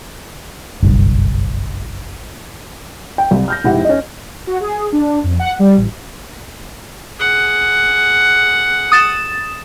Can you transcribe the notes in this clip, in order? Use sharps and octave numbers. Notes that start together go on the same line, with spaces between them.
F#1 B1 G2
G5
C2
F6 G6 A#6
F1 G#2 E4 G4 F#5
C#4 D#5
F#4
G#4
D4
F2
F#5
G3
A1
G#4 F#5
D#6 A6 E7